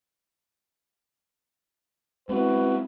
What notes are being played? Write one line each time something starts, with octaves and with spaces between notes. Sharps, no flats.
G#3 B3 C4 E4 F#4 B4